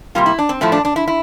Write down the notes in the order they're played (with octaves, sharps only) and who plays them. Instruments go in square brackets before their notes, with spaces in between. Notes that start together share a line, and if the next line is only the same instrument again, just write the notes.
[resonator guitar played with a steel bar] C3 G3 A#3 F4
E4
D4
C4
A2 F3 A3 E4
D4
D4
E4
E4